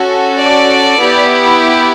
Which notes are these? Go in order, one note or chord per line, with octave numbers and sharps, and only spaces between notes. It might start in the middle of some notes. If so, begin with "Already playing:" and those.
Already playing: C#4 F#4 A4
D5
B3 E4 G4